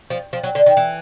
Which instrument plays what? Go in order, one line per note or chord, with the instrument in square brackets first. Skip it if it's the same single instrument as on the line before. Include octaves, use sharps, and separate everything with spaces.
[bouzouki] F3
F3
F#3
D3
D#3
E3